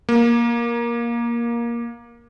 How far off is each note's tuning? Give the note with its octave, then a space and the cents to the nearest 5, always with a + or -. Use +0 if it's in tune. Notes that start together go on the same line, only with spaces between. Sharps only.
A#3 +15